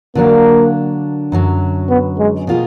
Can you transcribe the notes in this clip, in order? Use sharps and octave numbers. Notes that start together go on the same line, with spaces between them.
D3 F#3 A#3 D4
F#2 D3 F#3
B3
G#3
B2 A#3 F4 G#4